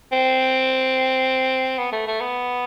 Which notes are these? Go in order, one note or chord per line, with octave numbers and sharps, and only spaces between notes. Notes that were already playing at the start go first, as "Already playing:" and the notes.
C4
B3
A3
A3
B3